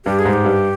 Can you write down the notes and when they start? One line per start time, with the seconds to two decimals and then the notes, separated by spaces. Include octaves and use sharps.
0.05 G2 G4
0.19 G#4
0.25 G#2
0.33 G4
0.45 G2